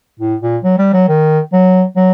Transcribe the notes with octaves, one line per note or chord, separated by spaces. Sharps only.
A2
A#2
F#3
G3
F#3
D#3
F#3
F#3